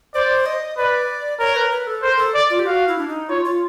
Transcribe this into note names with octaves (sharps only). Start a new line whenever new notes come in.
C5 D5
D#5
B4 D5
A#4 C#5
B4
B4
A4
A#4 C5
A4
D5
F4
G4
F#4 F5
E4
D4
D#4
F4 C#5
F4